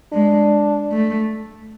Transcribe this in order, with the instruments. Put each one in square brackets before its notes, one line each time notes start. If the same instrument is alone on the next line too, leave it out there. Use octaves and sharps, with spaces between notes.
[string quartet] G#3 [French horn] D4
[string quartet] A3